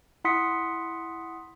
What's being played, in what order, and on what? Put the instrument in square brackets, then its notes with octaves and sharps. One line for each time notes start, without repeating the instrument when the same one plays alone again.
[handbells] E4 F#5 C6 D#6 B6 C#7